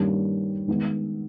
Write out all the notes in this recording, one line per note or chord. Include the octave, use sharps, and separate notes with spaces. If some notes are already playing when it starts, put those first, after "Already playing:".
Already playing: G2 D#3 G3 A#3 C#4
D#3 G#3 B3